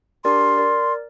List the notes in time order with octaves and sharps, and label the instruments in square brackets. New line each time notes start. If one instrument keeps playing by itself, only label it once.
[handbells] D4 G4 A#4 D5 [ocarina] C6
[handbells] A#4 D5